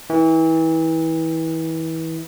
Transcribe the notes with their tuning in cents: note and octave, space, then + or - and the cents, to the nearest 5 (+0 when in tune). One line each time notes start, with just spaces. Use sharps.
E3 -30